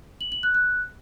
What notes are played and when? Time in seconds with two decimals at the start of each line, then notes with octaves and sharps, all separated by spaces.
0.21 F#7
0.32 F#7
0.43 F#6
0.55 F#6